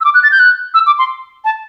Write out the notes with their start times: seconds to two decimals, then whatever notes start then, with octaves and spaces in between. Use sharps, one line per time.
0.01 E6
0.05 D6
0.14 F#6
0.23 A6
0.32 G6
0.39 F#6
0.74 E6
0.86 D6
0.98 C6
1.45 A5